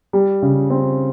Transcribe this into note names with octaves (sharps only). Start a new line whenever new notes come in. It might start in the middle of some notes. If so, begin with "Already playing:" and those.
G3
C#3
C4